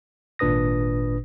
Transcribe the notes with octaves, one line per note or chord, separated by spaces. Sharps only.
G#1 A#2 D4 B4 D#6 A#6